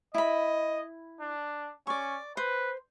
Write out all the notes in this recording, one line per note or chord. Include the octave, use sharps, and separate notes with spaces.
E4 D#5 B5
D4
C#4 D5 C#6
B4 C5